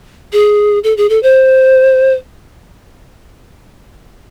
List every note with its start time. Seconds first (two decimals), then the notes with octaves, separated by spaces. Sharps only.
0.33 G#4
0.84 A4
0.97 G#4
1.09 A4
1.23 C5